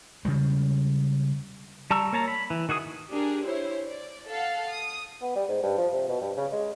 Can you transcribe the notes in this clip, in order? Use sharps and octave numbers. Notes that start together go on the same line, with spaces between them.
C#3 G3 G#3
G3 A5 A#5 C#6 E6
A#3 C#5 A5 A#5
B5
E3
D#3 F#4 G#4 D#6
D4 G4 G#4 A#4
E4 C5 C#5
D5
A4 F5 F#5
D#6
B3
G3
G#2
G2
F3
C3
B2
G2
C#3
G#3